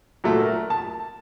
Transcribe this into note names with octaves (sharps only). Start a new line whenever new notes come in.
A#2 F#3 A3
A#4
A5